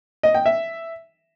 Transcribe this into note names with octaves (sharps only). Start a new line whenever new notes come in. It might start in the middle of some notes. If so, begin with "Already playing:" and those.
D#5
G5
E5